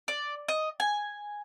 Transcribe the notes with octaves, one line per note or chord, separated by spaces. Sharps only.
D5
D#5
G#5